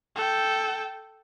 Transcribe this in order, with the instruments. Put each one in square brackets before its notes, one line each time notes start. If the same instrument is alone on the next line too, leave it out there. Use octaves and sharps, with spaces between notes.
[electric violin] A4 G5